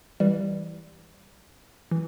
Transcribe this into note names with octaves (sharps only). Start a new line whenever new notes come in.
E3 G3
E3